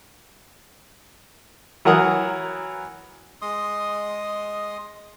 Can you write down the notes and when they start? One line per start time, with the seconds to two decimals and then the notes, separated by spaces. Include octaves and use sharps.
1.85 E3 F#3 A#4 F#5 A#5 D#6
3.42 G#3 D#5 C6 D#6